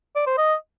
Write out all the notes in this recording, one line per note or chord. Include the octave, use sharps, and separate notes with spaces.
D5
C5
D#5